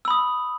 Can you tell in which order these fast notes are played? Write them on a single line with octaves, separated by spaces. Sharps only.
E6 B5 D#6